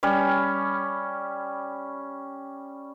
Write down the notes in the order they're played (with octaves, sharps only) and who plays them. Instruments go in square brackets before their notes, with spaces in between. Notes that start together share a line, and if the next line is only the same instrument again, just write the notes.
[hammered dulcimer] G3 C#4 B5